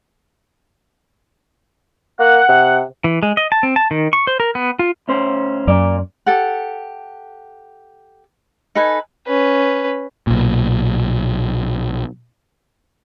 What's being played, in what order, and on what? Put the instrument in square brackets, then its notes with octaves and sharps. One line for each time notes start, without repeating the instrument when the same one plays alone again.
[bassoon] A#3 [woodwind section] F#5
[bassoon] C3
[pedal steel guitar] E3
G#3
D#5
A5
C4
A5
D#3
C#6
C5
A#4
B3
F4
[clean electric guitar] D2 C#4 C5
[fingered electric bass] F#2 [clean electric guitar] A#3 D5
[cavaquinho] G4 A4 F#5
D#4 A4 B4 G#5
[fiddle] C#4 B4
[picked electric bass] B1 A#2